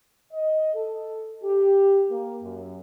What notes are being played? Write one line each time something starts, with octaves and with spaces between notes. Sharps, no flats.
D#5
A4
G4
A#3
F#2